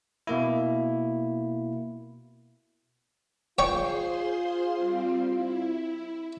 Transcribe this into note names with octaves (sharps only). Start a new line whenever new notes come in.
B2 A#3 E4
F4 G#4 C5 C#5 G5 C6 C#6
G3 C4
E4